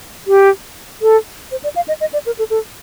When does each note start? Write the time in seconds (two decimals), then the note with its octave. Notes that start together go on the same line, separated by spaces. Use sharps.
0.27 G4
1.02 A4
1.51 C5
1.64 D5
1.76 F5
1.88 D#5
2.00 D#5
2.13 D5
2.26 A#4
2.39 A4
2.50 A4